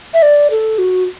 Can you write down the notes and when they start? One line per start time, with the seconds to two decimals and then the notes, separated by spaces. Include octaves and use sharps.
0.14 E5
0.22 D5
0.51 A4
0.78 F#4